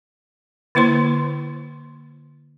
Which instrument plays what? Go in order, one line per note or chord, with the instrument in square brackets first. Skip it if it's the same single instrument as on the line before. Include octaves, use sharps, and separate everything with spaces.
[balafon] D3 A#3 E4 C5 C6